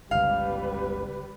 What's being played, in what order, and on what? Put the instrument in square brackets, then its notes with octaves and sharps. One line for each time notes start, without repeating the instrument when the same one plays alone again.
[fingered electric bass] G1 C#2 [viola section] G3 B4 [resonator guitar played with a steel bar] F5